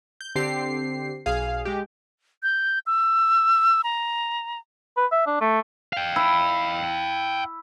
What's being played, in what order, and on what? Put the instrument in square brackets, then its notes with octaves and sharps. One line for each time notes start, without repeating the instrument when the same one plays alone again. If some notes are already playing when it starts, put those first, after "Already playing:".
[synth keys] G6
D3 C4 G4 C7
B1 G#4 F5
G#3 G4
[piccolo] G6
E6
A#5
[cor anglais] B4
E5
D4
A3
[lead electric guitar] F5 G5
[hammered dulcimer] E4